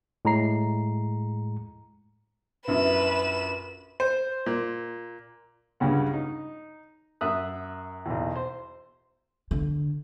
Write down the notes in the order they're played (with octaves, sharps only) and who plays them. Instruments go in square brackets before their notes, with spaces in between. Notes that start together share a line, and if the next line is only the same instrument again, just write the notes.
[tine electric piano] A2 G#3 A#5 C7
[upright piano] A#1 F#2 E4 [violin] B4 E7
[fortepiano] C5
A#2
C#2 G2 C#3 F#5
D#4
F#2 E5 D#6 F#6
B1 E2
C5
[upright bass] D3